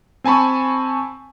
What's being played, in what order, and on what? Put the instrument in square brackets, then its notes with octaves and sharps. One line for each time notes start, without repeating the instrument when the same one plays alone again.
[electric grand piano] C4 G#5 A5 B5 C#6